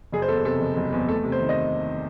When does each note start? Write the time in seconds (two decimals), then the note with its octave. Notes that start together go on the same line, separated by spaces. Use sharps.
0.12 F#1 G#4
0.22 C5
0.29 E2 A4
0.45 C3 A4
0.61 F#1
0.77 F#1
0.92 E2
1.09 A3 A4
1.24 C3
1.32 C5
1.40 D#3
1.49 D#5